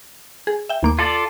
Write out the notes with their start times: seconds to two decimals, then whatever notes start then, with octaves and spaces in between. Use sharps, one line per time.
0.47 G#4
0.69 E5 G5
0.83 D#2 A#3 D6
0.99 F4 A4 D5